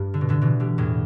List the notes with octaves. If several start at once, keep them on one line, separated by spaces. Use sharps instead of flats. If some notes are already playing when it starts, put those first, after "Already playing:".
Already playing: G2
D3
B2
A2 D3
B2 E3
D3 G3
E2 A2